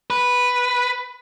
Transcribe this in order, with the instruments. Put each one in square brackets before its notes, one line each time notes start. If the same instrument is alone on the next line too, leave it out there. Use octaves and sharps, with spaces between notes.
[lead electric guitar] B4